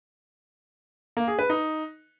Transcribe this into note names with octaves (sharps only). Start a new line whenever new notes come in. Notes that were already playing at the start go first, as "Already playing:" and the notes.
A#3
G#4
B4
D#4